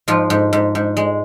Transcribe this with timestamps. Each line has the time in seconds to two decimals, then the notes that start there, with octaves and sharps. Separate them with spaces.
0.08 G#2 F3 F4
0.30 G#2
0.53 G#2
0.75 G#2
0.97 G#3